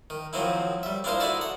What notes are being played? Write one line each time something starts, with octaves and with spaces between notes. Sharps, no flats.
D#3
D#3 F3 F#3 C4 D#4 E4
G3 E5
D4 E4 F4 A#4 C5 D#5
D#4 E4 F#4 A4 D5 E5
F#5